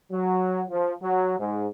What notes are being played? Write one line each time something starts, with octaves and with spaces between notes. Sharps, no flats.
F#3
F3
F#3
G#2